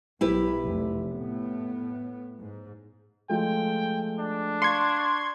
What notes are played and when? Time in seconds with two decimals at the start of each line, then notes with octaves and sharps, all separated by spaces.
0.21 B1 E4 G4 B4
0.65 F1
1.10 A2 B3
2.40 G#2
3.30 F3 G#3 A3 G5
4.19 D4
4.62 F5 C6 C#6 G#6